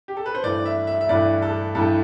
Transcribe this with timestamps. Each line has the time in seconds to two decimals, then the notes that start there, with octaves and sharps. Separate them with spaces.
0.08 G4
0.17 A4
0.26 B4
0.35 C5
0.43 G2 E3 A3 D5
0.65 E5
0.87 E5
1.01 E5
1.09 G2 E3 A3 D5
1.42 A4
1.75 G2 E3 A3 A4